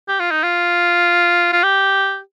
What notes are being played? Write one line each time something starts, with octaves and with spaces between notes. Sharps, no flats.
G4
F4
D#4
F4
F4
G4